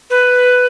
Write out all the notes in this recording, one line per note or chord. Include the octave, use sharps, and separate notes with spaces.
B4